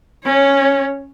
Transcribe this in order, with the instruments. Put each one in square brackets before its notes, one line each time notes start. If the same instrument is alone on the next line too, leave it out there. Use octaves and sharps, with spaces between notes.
[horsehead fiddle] C#4 C#5